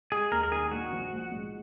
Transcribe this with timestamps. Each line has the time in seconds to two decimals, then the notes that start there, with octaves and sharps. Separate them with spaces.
0.11 G#3 G#4
0.32 D#2 A#4
0.43 A#4
0.52 D#3 G#4
0.71 A#1 F#4
0.92 F3
1.12 A#1
1.31 G#2